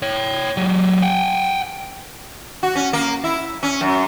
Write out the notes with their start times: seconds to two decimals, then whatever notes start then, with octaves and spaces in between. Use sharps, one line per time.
0.02 C#5 G5
0.57 F#3 G4
1.02 F#5 G5
2.63 F#4
2.75 C#4
2.93 A#3
3.24 E4
3.63 C#4
3.81 F#2